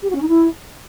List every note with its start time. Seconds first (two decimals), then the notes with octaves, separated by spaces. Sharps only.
0.03 G4
0.10 F#4
0.16 C#4
0.22 D#4
0.28 E4